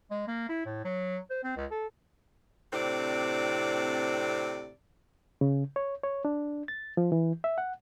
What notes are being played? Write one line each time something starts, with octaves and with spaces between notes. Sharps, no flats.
G#3
A#3
E4
A2
F#3
C5
C4
C#2
A4
A2 C3 C4 D4 D5
C#3
C#5
C#5
D4
A6
F3
E3
E5
F#5